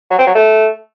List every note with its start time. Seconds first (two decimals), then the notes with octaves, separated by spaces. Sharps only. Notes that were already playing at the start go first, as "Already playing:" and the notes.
0.10 F#3
0.18 C4
0.27 F#3
0.35 A3